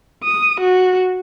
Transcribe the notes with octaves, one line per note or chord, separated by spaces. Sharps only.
D#6
F#4